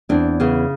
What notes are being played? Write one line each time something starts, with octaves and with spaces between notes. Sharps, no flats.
E2 C4 D4
C#3 B3 C#4